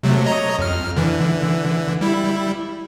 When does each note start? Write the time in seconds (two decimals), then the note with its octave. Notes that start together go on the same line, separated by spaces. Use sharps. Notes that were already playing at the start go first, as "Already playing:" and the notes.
0.03 C3 F#3 A3
0.26 C#5 D#5 A#5
0.59 F2 F6
0.97 D3 E3
2.01 G3 E4